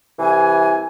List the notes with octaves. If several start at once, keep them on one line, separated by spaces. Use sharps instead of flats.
C2 E3 G#5